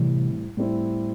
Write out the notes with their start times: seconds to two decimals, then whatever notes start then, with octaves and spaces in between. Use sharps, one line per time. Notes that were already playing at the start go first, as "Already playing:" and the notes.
Already playing: A2 C3 E3 G3 C4 E4
0.57 A2 G3 C4 E4